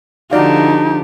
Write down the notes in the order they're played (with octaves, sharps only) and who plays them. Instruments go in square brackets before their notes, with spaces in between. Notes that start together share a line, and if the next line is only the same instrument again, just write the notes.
[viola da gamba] D3 F3 G4 [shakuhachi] D#4 [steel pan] F#4 D5 F5